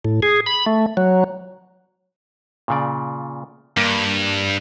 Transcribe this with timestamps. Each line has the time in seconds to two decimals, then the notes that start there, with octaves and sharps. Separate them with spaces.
0.05 A2
0.23 G#4
0.46 B5
0.66 A3
0.97 F#3
2.68 A#2 C#3 D5
3.77 G2 A#3